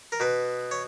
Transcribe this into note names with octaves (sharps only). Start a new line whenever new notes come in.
A#4
B2 B4
C#5